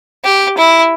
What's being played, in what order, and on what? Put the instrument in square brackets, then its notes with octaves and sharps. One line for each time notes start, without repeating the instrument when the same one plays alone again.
[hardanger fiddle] G4
E4